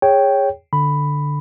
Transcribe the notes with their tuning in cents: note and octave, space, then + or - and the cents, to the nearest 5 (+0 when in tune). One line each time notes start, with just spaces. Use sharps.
G#4 -20 C#5 +0 G5 +0
D3 +0 B5 +5